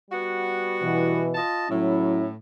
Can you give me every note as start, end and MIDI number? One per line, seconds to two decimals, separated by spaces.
0.11 1.25 55
0.11 1.25 59
0.11 1.25 66
0.82 1.37 47
0.82 1.37 52
1.35 1.69 65
1.35 1.69 75
1.35 1.69 81
1.69 2.34 45
1.69 2.29 54
1.69 2.29 61
1.69 2.29 64